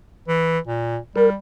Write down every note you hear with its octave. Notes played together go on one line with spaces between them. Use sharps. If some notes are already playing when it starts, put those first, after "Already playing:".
E3
A#2
G3 A#4